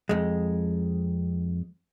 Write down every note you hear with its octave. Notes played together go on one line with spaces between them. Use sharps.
F2 G#3